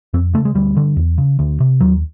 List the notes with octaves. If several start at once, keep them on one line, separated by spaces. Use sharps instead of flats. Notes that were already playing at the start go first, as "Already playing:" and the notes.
F2 C4
C#3 A3
G#3
D2 G3
D3
E2
C#3
D2
C3
D#2 F#3